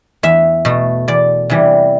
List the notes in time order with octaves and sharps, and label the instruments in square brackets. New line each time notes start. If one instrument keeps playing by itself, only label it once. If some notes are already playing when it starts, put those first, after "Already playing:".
[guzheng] E2 E5
B2 A3
E2 D5
C3 E3 G3